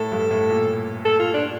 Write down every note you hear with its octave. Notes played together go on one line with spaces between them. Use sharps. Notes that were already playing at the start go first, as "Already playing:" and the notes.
Already playing: A2 A4
G2
A2
A#2
A4
F4
D4